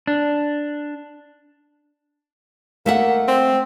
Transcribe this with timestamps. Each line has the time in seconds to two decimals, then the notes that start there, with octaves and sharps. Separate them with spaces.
0.07 D4
2.86 A3 A#3 E5 F#5
3.28 C4